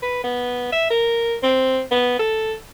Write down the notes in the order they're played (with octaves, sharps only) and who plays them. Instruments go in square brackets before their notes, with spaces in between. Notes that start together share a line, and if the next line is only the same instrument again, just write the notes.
[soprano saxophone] B4
B3
E5
A#4
C4
B3
A4